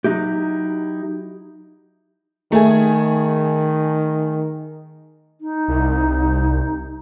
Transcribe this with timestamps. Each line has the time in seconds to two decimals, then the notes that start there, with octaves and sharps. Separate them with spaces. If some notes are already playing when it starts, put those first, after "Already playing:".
0.04 F#3 D#4 E4 G4
2.52 D#3 A3 G#4
5.41 D#4
5.68 C2